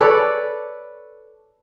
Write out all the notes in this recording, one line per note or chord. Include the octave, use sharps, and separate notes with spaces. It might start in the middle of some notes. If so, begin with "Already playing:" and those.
A4 B4 C#5 D5